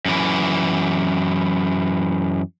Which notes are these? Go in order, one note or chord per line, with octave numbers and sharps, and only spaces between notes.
F#2 E3